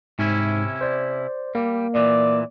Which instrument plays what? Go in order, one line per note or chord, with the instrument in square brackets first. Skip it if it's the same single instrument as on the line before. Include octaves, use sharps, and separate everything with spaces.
[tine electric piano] G#2 [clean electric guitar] C3 C#4 E4
[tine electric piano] C5 D5
[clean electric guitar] G3 [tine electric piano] A#3
[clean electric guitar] A#2 E3 [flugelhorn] D5